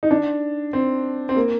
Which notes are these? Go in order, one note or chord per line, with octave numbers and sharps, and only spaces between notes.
D#4
D4
C4
C4
A#3